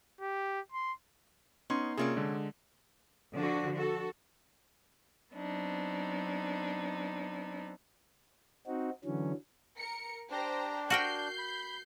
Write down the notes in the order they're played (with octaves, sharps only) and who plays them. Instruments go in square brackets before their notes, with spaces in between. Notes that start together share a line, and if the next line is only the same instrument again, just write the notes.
[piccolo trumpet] G4
C6
[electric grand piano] B3 D#4 C6 [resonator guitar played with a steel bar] C#4
[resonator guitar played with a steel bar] C3 C#4 D5 [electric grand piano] A#3 F4 G#4
[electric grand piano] D3 G#3
[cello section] D3 F3 D4 F#4
F#4 A4
[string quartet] F#3 B3 C4 D4 D#4
[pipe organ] C4 D#4 F#4
D3 E3 F#3 C#4
[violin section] A#4 C#7
[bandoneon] D4 [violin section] G4 C5 A#5
[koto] F#4 A#4 G5 [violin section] G6 C7
[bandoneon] B5